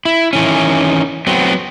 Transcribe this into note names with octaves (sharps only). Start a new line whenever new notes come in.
E4
D#3 E3 C#4
F#3 B3 C4